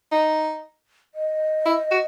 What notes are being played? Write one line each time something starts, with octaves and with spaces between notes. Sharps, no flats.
D#4
D#5
E4
F#4